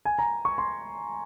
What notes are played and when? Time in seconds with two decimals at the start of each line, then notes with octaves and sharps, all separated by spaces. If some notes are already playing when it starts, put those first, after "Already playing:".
0.05 G#5
0.19 A#5
0.45 C#6
0.58 C6